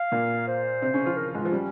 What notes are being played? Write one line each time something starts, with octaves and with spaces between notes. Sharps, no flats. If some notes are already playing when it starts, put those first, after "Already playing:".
Already playing: F5
A#2 A#3
C5
C3 C4
C#3 C#4
F3 F4
A#4
G#2 G#3
F3 F4
G3 C#4